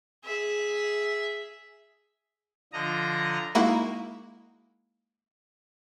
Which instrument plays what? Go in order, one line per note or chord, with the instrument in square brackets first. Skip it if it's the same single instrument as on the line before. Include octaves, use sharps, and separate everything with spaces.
[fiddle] G#4 E5
[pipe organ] D3 F3 D#5 A#5
[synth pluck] G#3 A#3 D#4 E4 F#4